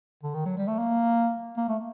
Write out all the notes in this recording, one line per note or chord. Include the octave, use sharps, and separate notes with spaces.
D3
D#3
F#3
G3
A3
A#3
A#3
A3